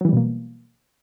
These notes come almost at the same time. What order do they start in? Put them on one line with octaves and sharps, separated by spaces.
F#3 E3 G3 B2 A#3